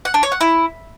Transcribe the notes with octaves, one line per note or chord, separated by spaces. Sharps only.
F#5
D4
C#5
F#5
E4